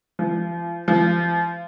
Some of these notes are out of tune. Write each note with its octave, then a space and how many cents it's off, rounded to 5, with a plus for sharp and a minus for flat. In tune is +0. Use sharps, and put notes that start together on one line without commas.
F3 -40
F3 -35